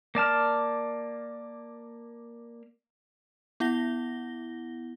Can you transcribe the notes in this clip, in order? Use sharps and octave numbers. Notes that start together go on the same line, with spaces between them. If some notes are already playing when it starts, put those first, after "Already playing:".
A#3 D5 A5 F6
B3 E4 F#5 A#6 G7